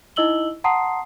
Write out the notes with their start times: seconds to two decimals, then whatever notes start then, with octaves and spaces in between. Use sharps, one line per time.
0.16 D#4 E4 D#5 E6 F#7 G7
0.64 F#5 A5 A#5 C6 D#6 C7